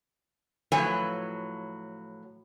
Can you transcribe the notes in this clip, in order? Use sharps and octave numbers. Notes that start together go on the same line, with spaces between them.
A2 F3 F#3 B4 C#5 G#5